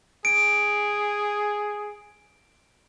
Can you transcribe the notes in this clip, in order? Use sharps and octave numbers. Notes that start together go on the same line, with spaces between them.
G#4 D7